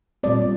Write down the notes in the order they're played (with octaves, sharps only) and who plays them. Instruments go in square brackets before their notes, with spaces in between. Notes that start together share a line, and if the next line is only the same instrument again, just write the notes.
[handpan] A#2 G3 C4 D5